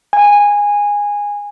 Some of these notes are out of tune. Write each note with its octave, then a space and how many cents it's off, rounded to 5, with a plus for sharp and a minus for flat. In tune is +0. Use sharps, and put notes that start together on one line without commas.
G#5 -15